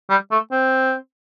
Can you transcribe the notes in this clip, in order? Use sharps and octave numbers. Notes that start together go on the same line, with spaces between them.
G3
A3
C4